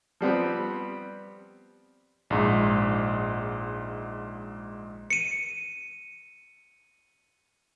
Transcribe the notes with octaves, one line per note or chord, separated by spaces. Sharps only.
F3 G3 B3 C4
A#1 G#2
C#7 D#7